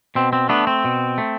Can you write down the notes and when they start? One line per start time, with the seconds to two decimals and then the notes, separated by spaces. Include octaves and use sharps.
0.15 B2 C4
0.33 C4
0.49 A3 B3 D4
0.67 C4
0.84 B2
1.18 A3